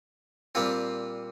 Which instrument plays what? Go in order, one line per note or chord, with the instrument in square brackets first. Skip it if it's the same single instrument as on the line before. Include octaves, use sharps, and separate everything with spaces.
[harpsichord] A#2 G3 C4 F4